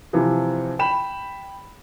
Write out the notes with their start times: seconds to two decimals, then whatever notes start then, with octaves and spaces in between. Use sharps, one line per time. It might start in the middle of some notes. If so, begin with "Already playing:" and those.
0.13 C3 E3 F3
0.79 G5 B5 E7